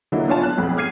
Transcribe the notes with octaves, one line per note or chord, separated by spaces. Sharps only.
D3 F#3 A#3 D#4 E4
B3 D4 F4 C#5 G#5 A5
F#6
B1 F2 B3
D6 F6 G#6 C7 D#7